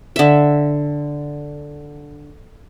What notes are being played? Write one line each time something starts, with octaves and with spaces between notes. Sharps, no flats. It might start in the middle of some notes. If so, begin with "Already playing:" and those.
D3 E5